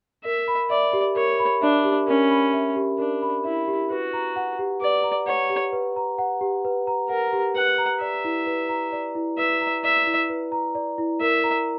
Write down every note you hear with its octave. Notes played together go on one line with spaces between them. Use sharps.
A#4 E5
B5
D5 E5
G4
A#4 C#5
B5
D4 E5
G4
C#4 A#4
B5
E5
G4
D4 A#4
B5
E4 E5
G4
F#4 B4
A#5
F#5
G4
B4 D5
A#5
C#5 F#5
G4
B4
A#5
F#5
G4
B4
A#5
A#4 F#5
G4
B4 F#5
A#5
D5 E5
E4
B4
A#5
D5
E4
B4 E5
A#5
D5 E5
E4
B4
A#5
D5
E4
A#4 E5
A#5